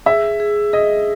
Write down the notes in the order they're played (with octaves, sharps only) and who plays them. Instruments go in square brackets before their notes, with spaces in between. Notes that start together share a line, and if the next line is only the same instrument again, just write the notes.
[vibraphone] G#4 [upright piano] E5
[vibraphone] G#4
[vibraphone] G#4 [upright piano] D#5